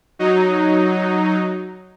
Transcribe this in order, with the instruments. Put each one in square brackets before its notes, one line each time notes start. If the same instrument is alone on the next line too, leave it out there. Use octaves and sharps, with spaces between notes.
[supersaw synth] F#3 D#4